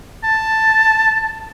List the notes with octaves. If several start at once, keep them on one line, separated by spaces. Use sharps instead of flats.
A5